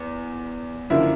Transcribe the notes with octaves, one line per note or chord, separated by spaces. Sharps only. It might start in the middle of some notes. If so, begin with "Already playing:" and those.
Already playing: E2
F#2 D3 F3 A#3 D4 E4 E5